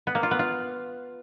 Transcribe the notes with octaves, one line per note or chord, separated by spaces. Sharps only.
B3
A#3
F4
B3
F4